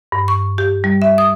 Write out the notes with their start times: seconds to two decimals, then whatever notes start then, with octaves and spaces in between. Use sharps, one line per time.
0.12 G2
0.28 C#6
0.58 G4
0.84 G3
1.02 E5
1.18 D#6